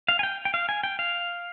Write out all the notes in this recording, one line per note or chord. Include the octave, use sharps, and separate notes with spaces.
F5
G#5
G5
G5
F5
G#5
G5
F5